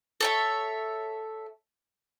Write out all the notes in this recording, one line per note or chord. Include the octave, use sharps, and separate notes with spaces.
A4 C#5 E5